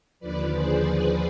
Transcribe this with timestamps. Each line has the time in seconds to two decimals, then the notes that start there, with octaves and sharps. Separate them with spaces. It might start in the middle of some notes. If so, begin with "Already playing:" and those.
0.20 D#2 D3 F3 B4 D5
0.53 G#4 C5